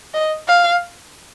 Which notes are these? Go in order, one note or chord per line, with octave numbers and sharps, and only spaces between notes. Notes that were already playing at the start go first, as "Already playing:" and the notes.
D#5
F5